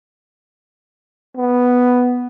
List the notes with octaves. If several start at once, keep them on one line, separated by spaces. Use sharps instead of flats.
B3